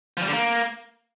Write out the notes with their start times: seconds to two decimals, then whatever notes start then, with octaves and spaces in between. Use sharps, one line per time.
0.17 F3
0.22 G3
0.28 D3
0.33 A#3